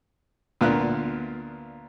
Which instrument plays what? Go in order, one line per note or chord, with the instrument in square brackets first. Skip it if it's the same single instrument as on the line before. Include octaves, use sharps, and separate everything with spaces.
[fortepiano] D2 A#2 B3 F4 A#4 F#6